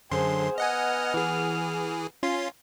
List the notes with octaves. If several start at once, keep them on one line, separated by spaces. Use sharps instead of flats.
F#2 D3 G#4 C5 C6
B3 D#5 F#5 G#5 F6
E3 G#4
C#4 F4 C6